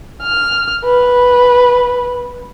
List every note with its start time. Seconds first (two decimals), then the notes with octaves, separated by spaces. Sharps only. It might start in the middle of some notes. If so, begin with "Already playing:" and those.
0.23 F6
0.85 B4